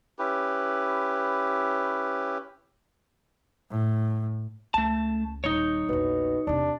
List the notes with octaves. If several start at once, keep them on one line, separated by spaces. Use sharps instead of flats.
C#4 E4 G4 B4
A2
C#2 A3 A5
D#1 G3 D#4 C#5
A#1 E2 B2
E2 C3 D4